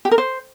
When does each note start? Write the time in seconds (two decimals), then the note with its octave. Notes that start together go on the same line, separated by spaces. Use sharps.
0.05 G4
0.11 A#4
0.18 C5